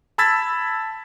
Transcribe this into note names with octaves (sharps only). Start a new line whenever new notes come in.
A5 B5 E6 G#6 A6 B6